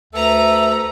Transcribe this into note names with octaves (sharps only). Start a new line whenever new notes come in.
D2 A4 B4 E5 A#5